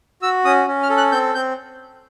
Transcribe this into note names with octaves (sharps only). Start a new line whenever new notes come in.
F#4 E6
C#4 D#6
C#4
F6
A4
F#6
C4 G6
C4 G6